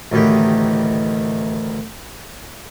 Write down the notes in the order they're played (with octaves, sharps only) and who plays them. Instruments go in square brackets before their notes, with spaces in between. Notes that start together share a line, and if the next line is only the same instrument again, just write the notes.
[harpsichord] A1 D2 D#3 E3 G4